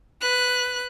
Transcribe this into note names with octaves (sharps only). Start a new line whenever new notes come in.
B4 F#6